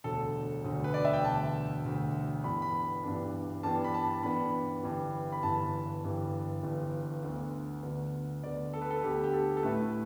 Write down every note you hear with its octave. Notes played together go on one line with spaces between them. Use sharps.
E1 D2 D3 A4
E1 D2 D3
B4
D5
E5
G5
E1 D2 D3 A5
E1 D2 D3
G2 E3 B3 D4 B5
B5
G2 E3 B3 D4
G2 E3 B3 D4 A5
B5
A5
G2 E3 B3 D4 B5
G1 G2 E3
B5
G1 G2 E3 A5
G1 G2 E3
G1 G2 E3
D2 D3 B3
D2 D3 B3
D2 D3 B3 D5
A4
B4
A4
D2 D3 B3 G4
G4
A4
A4
A2 A3 E4 B4